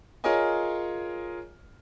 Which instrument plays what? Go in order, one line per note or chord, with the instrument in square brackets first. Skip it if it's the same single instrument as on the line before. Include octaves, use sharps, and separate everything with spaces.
[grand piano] F4 G#4 A#4 C#5 D#5 G#5